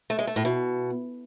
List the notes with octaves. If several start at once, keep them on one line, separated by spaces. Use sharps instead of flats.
A3
G#3
A3
A2
B2